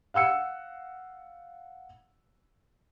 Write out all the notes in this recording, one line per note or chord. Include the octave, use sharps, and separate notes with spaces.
F5 F#5 E6 C#7